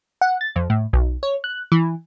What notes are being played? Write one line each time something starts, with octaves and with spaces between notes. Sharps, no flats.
F#5
A6
F2
A2
B1
C#5
F#6
E3